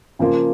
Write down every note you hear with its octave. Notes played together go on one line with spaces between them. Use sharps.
C#3 F3 A#3 F4